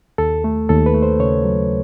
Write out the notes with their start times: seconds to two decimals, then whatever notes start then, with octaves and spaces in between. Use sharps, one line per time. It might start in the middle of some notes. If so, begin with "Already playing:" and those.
0.18 D#2 A4
0.44 A3
0.69 D#2 A4
0.86 B4
0.94 A3
1.03 C5
1.20 C#3 C#5
1.44 F#3